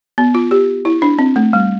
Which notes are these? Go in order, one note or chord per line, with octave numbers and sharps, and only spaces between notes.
B3
F4
G4
E4
D4
C4
A3
G3